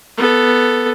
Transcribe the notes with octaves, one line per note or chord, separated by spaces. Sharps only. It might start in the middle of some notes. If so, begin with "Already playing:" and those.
B3 A4